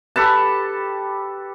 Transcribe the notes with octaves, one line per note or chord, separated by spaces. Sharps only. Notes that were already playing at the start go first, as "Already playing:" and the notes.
G4 A4 B4 A5